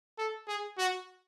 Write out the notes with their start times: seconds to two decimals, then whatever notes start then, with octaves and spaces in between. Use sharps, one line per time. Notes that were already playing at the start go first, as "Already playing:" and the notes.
0.18 A4
0.47 G#4
0.78 F#4